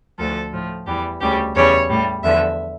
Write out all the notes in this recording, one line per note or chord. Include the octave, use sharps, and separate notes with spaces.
D2 D3 F3 A4
A2 F3
E2 E3 G3 G4
D2 C#3 G3 G4
E2 C#3 G3 C#5
A2 G3
E2 D3 F3 E5